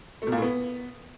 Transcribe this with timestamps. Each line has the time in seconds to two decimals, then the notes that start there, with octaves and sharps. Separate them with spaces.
0.22 A3
0.27 B2
0.32 A#2
0.37 A2
0.42 B3